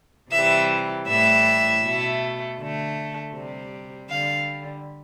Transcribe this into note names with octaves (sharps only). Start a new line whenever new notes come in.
C3 E3 G3 E5
A2 E3 G3 E5
B2 A3
D3 A3
C3 G3
D3 G3 F5